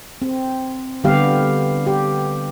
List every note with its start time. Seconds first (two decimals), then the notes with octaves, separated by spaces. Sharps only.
0.22 C4
1.04 D3 G3 B3 G4 F5
1.87 G4